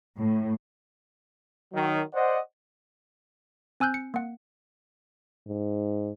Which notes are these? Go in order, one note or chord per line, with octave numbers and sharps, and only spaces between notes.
A2
D#3 F#3
C5 D5 D#5 F#5
C4 G#5 E6 F#6 G6
C#7
A#3 F#5
G#2